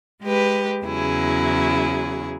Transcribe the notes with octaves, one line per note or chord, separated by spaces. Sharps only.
G#3 G4 B4
E2 C#3 F#3 E4 G#4